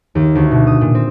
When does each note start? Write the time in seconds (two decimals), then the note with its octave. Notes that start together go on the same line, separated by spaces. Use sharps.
0.15 D#2
0.35 D2
0.51 B2
0.67 D#6
0.81 A#2
0.95 C4